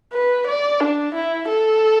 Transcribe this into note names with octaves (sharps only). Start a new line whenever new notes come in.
B4
D5
D4
E4
A4